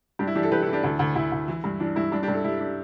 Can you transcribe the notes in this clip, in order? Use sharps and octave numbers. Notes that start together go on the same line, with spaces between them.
G2 D4 G4
E4
E3 D4 G4
E4 A4
E3 G4 B4
E4 A4
E3
D4 G4
D2 D4
D2
D2 E4
D2
E3
G2
E3 D4
G2 E4
G2 D4
D4 G4
G2
E4 A4
G2 E4
D4